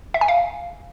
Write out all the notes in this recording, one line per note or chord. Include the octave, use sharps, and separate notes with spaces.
E5
G#5
F5